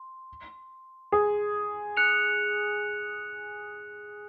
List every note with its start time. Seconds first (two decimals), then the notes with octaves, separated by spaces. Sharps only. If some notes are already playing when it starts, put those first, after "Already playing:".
Already playing: C6
1.12 G#4
1.97 F#6 C#7 F7